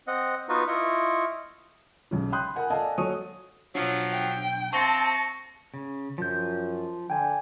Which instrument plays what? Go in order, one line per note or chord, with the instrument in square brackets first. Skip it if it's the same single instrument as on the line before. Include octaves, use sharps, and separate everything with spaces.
[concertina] C4 D#5 F#5
B3 D#4 F4 F#4 B4
E4 F4 D#5 C#6
[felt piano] B1 C#3
G5 B5 C6 D#6 F#6 G6
A#4 F#5 G#5
A4 D5 D#5 F5 G#5 A5
F#3 A4 C#5 C#6 D#6 D#7
[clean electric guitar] B1 D4 [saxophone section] F3 F#3
[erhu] G5
[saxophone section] C4 [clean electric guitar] E5 F5 G5 [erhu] A5 [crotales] C#6 A#6 C#7
[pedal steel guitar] C#3
[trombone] F#2 [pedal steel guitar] F3 G6
[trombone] D3 [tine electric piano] G5 G#5